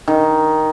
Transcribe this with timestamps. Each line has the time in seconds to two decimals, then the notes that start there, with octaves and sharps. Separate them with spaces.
0.08 D#3